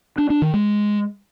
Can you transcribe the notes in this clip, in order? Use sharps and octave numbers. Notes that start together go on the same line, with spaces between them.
D4
D4
D#3
G#3